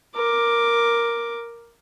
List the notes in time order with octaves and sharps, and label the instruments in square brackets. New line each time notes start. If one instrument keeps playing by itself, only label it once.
[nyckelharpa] A#4 D6